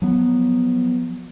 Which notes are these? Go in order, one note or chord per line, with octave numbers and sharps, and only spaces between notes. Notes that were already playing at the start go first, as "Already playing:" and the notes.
F3 F#3 B3